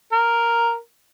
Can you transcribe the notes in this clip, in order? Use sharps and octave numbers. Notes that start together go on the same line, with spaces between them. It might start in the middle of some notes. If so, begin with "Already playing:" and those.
A#4